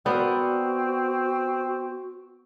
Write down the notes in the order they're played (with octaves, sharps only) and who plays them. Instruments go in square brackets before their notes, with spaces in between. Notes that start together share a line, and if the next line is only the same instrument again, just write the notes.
[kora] B3 [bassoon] C4 [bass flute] F#4 [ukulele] A#4 C5 D5